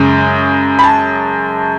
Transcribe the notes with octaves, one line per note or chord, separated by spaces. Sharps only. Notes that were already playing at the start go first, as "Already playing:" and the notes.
Already playing: F#2 C#3 G#3
B5
A5